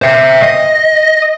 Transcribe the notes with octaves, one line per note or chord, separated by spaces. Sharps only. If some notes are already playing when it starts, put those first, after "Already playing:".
C5 E5
D#5